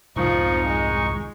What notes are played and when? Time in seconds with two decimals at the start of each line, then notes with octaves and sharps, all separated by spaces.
0.16 C2 F2 G#2 D#3 F3 D#4 C#6
0.67 G#3